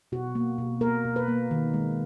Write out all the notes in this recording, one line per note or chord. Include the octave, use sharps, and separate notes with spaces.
B2 F#4
A#3
B2
A#3 A#4
B2
B4
A#3
D#3
G#3